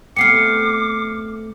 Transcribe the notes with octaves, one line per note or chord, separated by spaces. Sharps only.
A3 B3 C4 D6 F6 C7 C#7